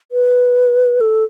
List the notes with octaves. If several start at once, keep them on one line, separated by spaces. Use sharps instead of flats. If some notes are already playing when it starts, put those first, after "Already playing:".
B4
A4